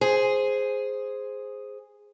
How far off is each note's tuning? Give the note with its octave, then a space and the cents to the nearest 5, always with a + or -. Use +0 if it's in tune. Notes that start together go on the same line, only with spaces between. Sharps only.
G#4 +0 C5 +0